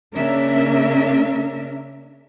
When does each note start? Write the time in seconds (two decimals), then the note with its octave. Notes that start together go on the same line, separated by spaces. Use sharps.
0.16 C#3 A#3 C#4 D4 A#4 E5